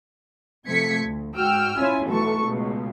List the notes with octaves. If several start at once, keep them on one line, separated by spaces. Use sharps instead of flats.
C3 F3 A3 G#6 B6 C#7
D2
G#2 F#4 G5 E6 F6
C#4 E4 F4 G#5
B1 E3 A3 A4 B4 C#6
C#2 B2